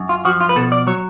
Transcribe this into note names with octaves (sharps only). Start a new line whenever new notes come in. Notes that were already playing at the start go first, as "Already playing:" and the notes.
Already playing: F#2
F4
F3 F#4
F4
B4
B2 A4
D5
F#3 C#5